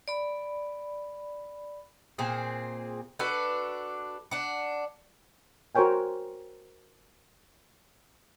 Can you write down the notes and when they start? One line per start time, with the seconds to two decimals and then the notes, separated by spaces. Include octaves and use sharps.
0.08 D5 B5
2.18 A#2 C4 G#4
3.19 D4 F#4 A4 B4
4.31 D4 F#5
5.75 F#4 A#4 C5 C#5 G5 G#5